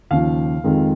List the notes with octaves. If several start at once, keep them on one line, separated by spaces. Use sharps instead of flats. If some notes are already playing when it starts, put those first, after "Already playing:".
D#2 C#3 F3 F5
F2 D#3 G#3 C4